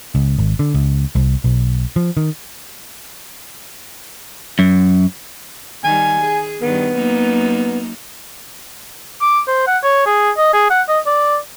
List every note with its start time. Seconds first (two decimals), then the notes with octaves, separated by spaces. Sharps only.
0.15 C#2
0.39 G#1
0.59 D3
0.74 C#2
1.15 C2
1.44 B1
1.96 F3
2.17 D#3
4.59 F#2
5.84 D#3 G3 G#5
6.20 G#4
6.62 G2 D#3 B3
6.95 F#2 A#3 D#4
9.21 D6
9.48 C5
9.67 F#5
9.83 C#5
10.06 G#4
10.37 D#5
10.53 G#4
10.70 F#5
10.89 D#5
11.06 D5